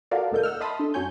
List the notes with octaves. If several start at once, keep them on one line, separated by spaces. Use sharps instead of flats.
F4 F#4 A4 A#4 D5 F5
D2 A#2 D#4 A4 A#4 G6
F#5 E6 F6
D#5 E5 A5 B5 C6 D#6
D4 A4
F#2 F#3 C#4 C#5 G#5 G6